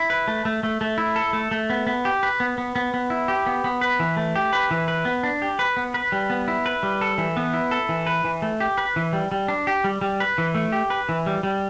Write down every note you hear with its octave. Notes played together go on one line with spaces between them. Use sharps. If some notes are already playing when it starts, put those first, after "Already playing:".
Already playing: E4
B4
A3
A3
A3
A3
E4
A4
A3
A3
B3
B3
G4
B4
B3
B3
B3
B3
E4
G4
B3
B3
B4
E3
A3
G4
B4
E3
B4
B3
D4
G4
B4
B3
B4
G3
B3
E4
B4
G3
A4
E3
B3
E4
A4
E3
B4
E3
A3
G4
B4
E3
G3
G3
D4
G4
G3
G3
B4
E3
A3
G4
B4
E3
G3
G3